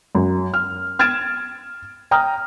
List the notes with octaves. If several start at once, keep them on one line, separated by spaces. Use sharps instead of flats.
F#2
F6
F6 G#6 A6 D7 E7
G5 A#5 D#6 F6